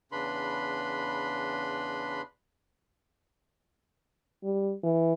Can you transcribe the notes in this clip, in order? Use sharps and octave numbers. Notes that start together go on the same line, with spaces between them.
E2 C#3 D4 B4 B5 C6
G3
E3